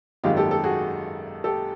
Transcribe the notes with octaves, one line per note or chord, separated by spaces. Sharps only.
G#1 F#2 D#3 G#3 F4 G4
G4 A4
G4 A4
F#4 G#4
G4 A4